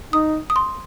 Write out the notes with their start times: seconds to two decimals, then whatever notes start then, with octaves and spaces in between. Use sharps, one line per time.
0.12 D#4 D#6
0.50 D#6
0.56 C6